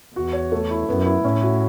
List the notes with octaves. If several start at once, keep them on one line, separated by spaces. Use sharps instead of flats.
E2 F#4
C#5
A3
E4
F#2 B3
E4
A2 C#4
F#4